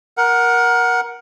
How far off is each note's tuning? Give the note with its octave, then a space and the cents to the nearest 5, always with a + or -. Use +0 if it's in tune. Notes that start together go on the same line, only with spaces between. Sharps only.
A#4 +15 F#5 +0